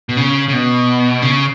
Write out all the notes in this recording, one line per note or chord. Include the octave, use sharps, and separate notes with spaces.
B2
C#3
C#3
B2
C#3